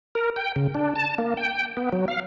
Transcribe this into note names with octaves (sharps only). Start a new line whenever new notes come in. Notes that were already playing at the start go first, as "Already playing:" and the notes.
A#4
G5
C#3
D4
A5
A#3
G5
B3
F#3
F5